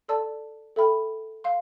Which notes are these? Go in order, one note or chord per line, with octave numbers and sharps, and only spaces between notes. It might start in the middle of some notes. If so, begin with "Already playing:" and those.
A4 D5 A5 C6 E6
A4 E5 G5 B5 F6
F5 C6